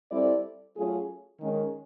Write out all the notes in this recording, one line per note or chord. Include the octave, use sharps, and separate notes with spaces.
G3 C4 E4 A4 D5
F#3 A3 C#4 F4 G#4
D#3 G#3 C#4